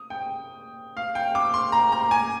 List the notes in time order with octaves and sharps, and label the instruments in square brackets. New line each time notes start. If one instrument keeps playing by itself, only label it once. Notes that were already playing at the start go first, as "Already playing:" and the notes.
Already playing: [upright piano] D#6
G5
F5
G5
D6
C6
A#5
A#5
G#5